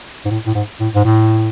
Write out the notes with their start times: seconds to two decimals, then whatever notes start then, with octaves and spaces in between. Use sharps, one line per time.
0.25 G#2
0.31 A2
0.47 A2
0.55 G#2
0.80 A2
0.95 G#2
1.05 A2